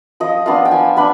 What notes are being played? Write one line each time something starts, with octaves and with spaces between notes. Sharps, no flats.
F3 D#5
B3 D4 F4 F5
G5
F3 G#5
B3 D4 B5